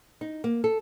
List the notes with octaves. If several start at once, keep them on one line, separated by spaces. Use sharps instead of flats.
D#4
A#3
A4